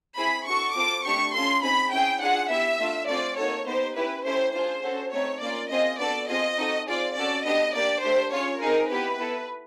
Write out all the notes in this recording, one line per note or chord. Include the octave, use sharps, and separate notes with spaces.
C4 E4 G#4 B5
D4 F#4 A4 C#6
C4 F4 A4 D6
A3 D4 G4 C#6
C#4 F4 A4 C6
C4 D#4 G#4 B5
C#4 E4 G#4 G5
D4 F4 G#4 F#5
B3 E4 G4 E5
A3 D4 F4
A3 C4 F4 G#4 D5
A#3 D#4 F#4 A4 C#5
B3 D#4 G4 C5
C#4 E4 G4 B4
A3 C#4 E4 G4 C5
D4 F4 G#4 C5
C#4 F#4 A4
A3 C4 D#4 C#5
A#3 C#4 F4 D5
C4 F4 G#4 D#5
B3 D4 F#4 A4 D5
C4 F4 G#4 D#5
C4 D#4 F#4 A4
C4 F4 G#4 D5
C#4 F#4 A4 D5
B3 D4 G4 D#5
A#3 D4 G4 D5
A3 D4 G4 C5
C#4 F4 G#4 C#5
C4 D#4 G#4 A#4
B3 E4 G4 B4
B3 E4 A4